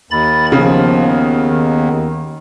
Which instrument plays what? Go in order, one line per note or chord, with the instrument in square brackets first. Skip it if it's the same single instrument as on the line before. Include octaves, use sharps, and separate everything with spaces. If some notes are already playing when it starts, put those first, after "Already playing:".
[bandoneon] D#2 [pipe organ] B5 A6
[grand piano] C#3 [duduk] F3 [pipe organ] B3
[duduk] D#3